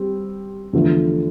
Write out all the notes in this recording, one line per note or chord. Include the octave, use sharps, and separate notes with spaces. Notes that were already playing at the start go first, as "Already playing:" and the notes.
Already playing: G3 C4
E2 D3 F3 A3